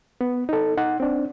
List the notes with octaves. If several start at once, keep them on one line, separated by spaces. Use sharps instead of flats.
B3
D#4 A4
D#4 F#5
C4 D4